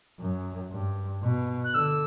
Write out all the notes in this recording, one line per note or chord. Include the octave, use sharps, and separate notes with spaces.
F#2
G2
B2
F#6
D3 E6